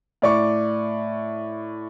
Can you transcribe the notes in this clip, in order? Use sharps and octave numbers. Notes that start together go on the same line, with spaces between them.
A2 D5 C#6